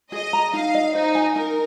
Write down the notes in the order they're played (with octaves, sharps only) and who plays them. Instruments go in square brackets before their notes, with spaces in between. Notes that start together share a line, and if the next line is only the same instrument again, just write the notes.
[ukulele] G#4 [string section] D#5
[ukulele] A#5
[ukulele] D#4 [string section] F5
[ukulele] D#5
[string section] D#4 [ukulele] C5
[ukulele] G#5
[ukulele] D#4 [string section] A#4